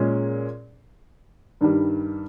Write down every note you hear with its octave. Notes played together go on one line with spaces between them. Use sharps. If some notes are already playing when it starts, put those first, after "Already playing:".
Already playing: A#2 G#3 C#4 G#4
G2 D#3 G3